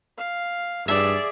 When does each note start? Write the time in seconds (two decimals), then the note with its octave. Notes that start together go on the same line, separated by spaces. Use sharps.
0.18 F5
0.88 G2 G#4 D5 E5